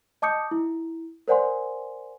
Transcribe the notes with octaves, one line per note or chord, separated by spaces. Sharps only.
D#5 A5 D6 D#6 G6 C#7
E4
A#4 C5 D5 F#5 G#5 C6